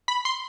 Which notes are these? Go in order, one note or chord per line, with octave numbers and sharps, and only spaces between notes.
B5
C6